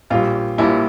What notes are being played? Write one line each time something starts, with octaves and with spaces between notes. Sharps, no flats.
A#1 A#2 G3 F4
A#1 A#2 G3 E4